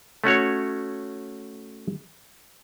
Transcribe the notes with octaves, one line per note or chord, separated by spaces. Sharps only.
A3 C#4 F#4 C#5